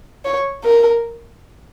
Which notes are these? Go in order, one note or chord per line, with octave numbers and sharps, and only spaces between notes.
C#5
A#4